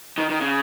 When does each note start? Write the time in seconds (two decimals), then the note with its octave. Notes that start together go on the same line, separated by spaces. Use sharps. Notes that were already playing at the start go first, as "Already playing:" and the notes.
0.18 D#3
0.30 D#3
0.41 C#3